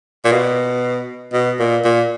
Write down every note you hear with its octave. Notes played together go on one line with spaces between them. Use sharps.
A#2
B2
B2
A#2
A#2